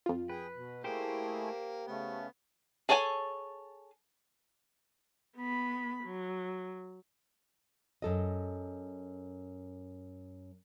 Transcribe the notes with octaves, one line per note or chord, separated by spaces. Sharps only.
F2 F4
G#4 B4 G5
B2
A3 A#3 E4 G4 G#4 C5 G5
C#3 A3 B3 C#4
G#4 A4 C#5 D5 G#5
B3 B5
F#3
F#2 A4 D#5